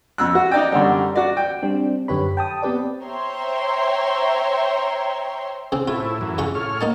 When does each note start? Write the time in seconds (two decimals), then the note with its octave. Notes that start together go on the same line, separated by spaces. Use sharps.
0.18 F2 E6 F#6
0.35 F#4
0.51 D#4 D5 G5
0.72 F#2 D3 G3
1.16 F#4 D5
1.37 G5
1.63 G3 C4 D4
2.08 F#2 D3 G4 B4 C#5 B5
2.37 G5 A5 D#6
2.62 B3 C4 G4 B4 D5
3.04 C5 C#5 E5 G5 A#5 C6
5.72 C#3 C4
5.88 A2 E4 F4
6.21 F#2 E3
6.38 C#3 F4 C#6
6.55 A2 C#5 F6
6.81 A#3 D#4 A5